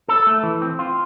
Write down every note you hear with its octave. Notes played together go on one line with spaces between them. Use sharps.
A4
A3
E3
C4
F4